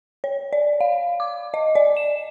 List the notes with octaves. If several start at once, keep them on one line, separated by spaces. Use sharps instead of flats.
C#5
D5
F5
D6
D#5
D5
E7